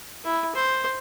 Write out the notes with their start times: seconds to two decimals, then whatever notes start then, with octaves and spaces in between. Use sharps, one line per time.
0.25 E4
0.55 C5